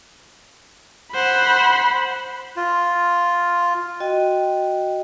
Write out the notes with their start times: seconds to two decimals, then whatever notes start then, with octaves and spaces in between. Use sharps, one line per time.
1.14 C5 F#5 B5
2.56 F4
4.00 F#4 D#5 G5